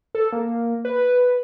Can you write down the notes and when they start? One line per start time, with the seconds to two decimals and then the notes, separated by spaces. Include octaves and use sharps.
0.15 A4
0.32 A#3
0.85 B4